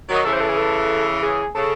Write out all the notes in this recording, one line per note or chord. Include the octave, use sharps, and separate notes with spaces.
D#3 F#3
D#5
C#3 E3 A4
C5
A4
G#4
A4
G#4
C#3 A4